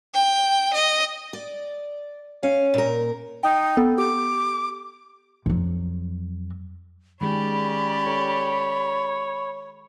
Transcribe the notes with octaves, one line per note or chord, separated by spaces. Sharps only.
G5
D#5
D5
C#4 F5
A#2 A#4
D#4 G5
B3 A4
G4 D6
F2 F#3
D#3 G#3 C#4 G4 G#4 D5 B5
A4 C#5